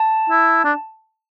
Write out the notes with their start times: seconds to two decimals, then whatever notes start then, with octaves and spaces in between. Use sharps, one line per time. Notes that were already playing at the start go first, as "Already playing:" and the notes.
Already playing: A5
0.30 E4
0.65 D4